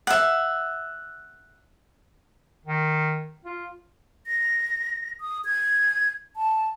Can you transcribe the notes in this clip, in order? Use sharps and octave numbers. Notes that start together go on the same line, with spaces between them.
E5 F#5
D#3
F4
A#6
D#6
G#6
A5